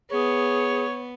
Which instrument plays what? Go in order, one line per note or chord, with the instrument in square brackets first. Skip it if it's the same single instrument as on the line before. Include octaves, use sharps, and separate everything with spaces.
[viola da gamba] B3 [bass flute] G#4 [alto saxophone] C#5